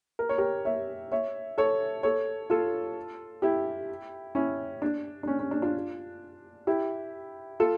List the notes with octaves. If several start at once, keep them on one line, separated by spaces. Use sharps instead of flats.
A#4
C#5
G4 A#4
C#5 E5
C#5 E5
A4 C#5
A4 C#5
F4 A4
E4 G4
C#4 E4
D4
D4
C#4
C#4
D4
D4 F4
E4 G4
F4 A4